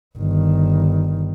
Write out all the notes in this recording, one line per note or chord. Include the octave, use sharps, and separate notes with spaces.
G1 D#3